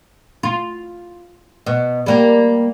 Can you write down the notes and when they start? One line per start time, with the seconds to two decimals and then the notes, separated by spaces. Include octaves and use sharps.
0.43 F4
1.66 B2
2.06 G3 A#3 G4